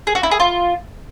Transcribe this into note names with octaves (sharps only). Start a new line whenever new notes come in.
G#4
F#4
E4
G#4
F4